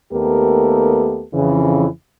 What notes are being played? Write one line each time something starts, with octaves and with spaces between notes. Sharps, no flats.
D#2 A3 B3 G4 A4 A#4
F2 C#3 E3